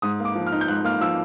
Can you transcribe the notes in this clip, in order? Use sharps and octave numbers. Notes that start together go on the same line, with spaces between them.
G#2 D#6
A#3
D6
F3
F6
D#4
G6
G#2 F#6
A#3 F6
F3 E6